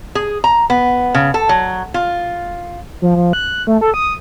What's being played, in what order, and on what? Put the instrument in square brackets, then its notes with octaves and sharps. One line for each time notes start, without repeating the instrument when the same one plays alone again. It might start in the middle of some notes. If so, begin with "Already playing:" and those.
[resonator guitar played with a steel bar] G#4
A#5
B3
C#3
A4
F#3
F4
[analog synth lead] F3
F3
F#6
A3
A4
D#6